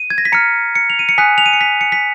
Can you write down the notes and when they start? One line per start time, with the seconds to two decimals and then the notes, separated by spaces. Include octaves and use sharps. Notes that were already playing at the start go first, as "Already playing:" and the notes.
Already playing: D#7
0.10 G#6
0.18 A#6
0.25 B6
0.32 A#5 F6 C#7
0.75 C#7
0.90 F7
0.99 D#7
1.09 C#7
1.18 G#5 D#6 F#6 B6
1.38 F7
1.46 D#7
1.53 C#7
1.61 B6
1.81 C#7
1.92 B6